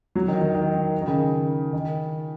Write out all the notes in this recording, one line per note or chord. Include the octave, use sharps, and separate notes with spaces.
F#3
D#3
D#3
D#3
D#3
D#3
C#3
D#3